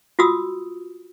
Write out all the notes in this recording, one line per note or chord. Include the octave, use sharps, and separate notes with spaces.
F4 F#4 D#6 E6